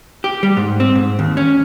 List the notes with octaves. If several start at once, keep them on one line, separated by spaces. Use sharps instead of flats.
G4
G3
G#2
C4
G#2
D#2
C#4